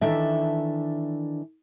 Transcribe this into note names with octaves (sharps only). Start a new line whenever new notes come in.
D#3 E3 D4 A4 E5